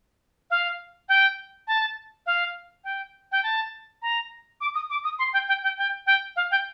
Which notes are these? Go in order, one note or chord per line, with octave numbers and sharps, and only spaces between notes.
F5
G5
A5
F5
G5
G5
A5
A#5
D6
D#6
D6
D#6
C6
G5
G5
G5
G5
G5
F5
G5